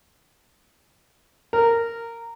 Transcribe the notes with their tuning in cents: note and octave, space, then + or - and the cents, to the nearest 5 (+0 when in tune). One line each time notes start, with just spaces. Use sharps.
A#4 -15